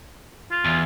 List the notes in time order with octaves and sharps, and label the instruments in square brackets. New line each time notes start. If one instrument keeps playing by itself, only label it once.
[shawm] F4
[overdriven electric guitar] E2